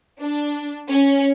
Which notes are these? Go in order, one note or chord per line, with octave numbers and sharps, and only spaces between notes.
D4
C#4